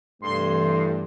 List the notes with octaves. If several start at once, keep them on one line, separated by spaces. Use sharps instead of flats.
G2 C3 E3 A3 C6